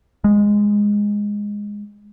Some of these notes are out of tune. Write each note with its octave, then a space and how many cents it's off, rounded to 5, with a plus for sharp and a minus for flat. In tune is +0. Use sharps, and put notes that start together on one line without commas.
G#3 -10